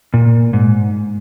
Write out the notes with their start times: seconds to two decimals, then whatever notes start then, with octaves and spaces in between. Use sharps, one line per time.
0.14 A#2
0.53 G#2